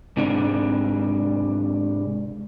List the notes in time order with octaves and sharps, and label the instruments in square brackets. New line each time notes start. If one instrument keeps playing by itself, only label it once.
[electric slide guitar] G#2 C3 D4